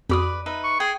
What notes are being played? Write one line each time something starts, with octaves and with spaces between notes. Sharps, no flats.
F2 F#4 B4 D5 B5 D#6
D#4 B4 E5
C#6
G#4 G5